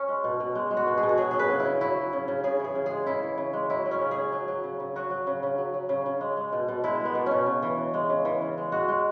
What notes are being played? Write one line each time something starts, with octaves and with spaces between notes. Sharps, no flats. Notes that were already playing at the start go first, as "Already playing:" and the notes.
Already playing: C#4
G#3
B2
B2
G#3
G#3
F#4
B2
G#4
B2
F#4
F#3 G#4
F#3 G#4
B4
C#3
E4
C#3
F#3 E4
F#3
C#3
C#3
C#3 G#4
E3 G#4
C#3
G#3 G#4
C#3 E4
E3
C#3
G#3
F#3 E4
F#3
C#4
C#3
G#4
C#3
F#3
F#3
C#3
C#3
F#3 F#4
F#3
C#3
C#3
F#3
F#3
C#3
C#3
G#3
G#3
B2
B2
G#3 E4
G#3
B3
B2
C#4
B2
C#3
E3
C#3
G#3
C#3
E3
C#3
G#3
G#3 F#4
G#3